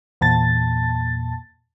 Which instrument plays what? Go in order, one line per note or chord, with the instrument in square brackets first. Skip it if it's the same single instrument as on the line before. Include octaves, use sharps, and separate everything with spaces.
[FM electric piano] E2 A#2 A5 A6